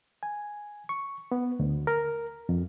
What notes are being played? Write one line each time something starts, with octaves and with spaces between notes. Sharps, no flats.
G#5
C#6
B3
D2
A#4
F2